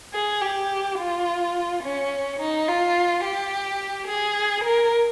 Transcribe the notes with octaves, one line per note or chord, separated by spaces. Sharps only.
G#4
G4
F4
C#4
D#4
F4
G4
G#4
A#4